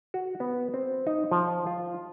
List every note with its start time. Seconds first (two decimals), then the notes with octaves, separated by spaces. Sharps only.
0.14 F#4
0.40 B3
0.74 C4
1.07 D#4
1.31 F3
1.67 F4